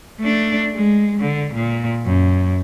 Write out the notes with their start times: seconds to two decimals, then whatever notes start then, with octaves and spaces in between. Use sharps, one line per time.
0.20 A3 D4
0.74 G#3
1.21 D3
1.54 A#2
2.05 F#2